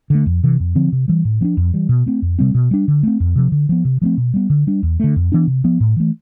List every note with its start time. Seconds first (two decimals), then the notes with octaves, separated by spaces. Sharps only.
0.10 D3 A3
0.26 F2
0.43 C3 E3
0.60 F2
0.75 D3 F3 C4
0.92 C3
1.08 E3 G3
1.25 A2
1.41 F3 B3 D4
1.57 F2
1.74 E3 G3
1.89 B2
2.06 A3 C4
2.22 F2
2.39 C3 G3 C4
2.55 B2
2.71 G3 D4
2.88 D3
3.03 A3 C4
3.20 F2
3.36 C3 F3
3.52 D3
3.69 F3 B3
3.85 C3
4.02 F3 A3 C4
4.17 B2
4.34 G3 B3
4.50 D3
4.67 G3 D4
4.83 E2
5.00 D3 A3
5.16 F2
5.32 E3 B3 D4
5.47 C3
5.64 F3 B3
5.80 A2
5.96 E3 A3